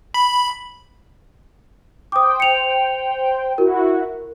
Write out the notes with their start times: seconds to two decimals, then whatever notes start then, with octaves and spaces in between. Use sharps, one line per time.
0.14 B5
2.12 C5 G5 D6 D#6
2.40 C#7 F7
3.58 E4 F#4 A#4